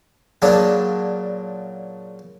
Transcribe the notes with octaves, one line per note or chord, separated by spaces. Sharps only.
A#2 C#3 F#3 D4 G#4